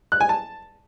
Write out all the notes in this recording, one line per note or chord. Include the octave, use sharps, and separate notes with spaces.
F#6
G#5
A5